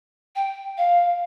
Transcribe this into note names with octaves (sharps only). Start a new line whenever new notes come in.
G5
F5